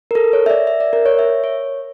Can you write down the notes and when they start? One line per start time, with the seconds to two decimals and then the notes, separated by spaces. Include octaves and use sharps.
0.11 A#4
0.15 A4
0.33 C#5
0.46 E5
0.50 D5
0.67 E5
0.80 D5
0.93 A#4
1.06 C#5
1.19 E5
1.44 C#5